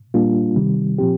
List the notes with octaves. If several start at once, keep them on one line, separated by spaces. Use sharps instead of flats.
A#2 G3 A#3 D4 F4
C3 D#3 G3
A#2 F3 C4 G4